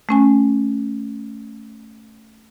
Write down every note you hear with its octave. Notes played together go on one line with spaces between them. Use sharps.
A3 C#4 G#5